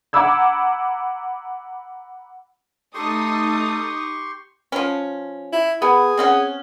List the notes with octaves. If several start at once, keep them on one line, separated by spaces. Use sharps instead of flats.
F#5 A#5 B5 D6 E6 G#6
A3 D#4 G4 A4 C6 C#6 D#6
F3 C#4
E4
B3 G#4
C4 C#4 F#5